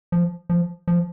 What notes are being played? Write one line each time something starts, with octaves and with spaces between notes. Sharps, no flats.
F3
F3
F3